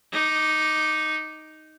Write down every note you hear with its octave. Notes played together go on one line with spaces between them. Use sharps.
D#4 D6